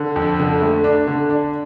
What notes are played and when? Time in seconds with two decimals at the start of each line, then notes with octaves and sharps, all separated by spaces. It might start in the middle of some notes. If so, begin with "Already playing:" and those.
Already playing: D3
0.16 F2
0.39 D3
0.62 A3
0.84 D4
1.07 D3
1.30 D4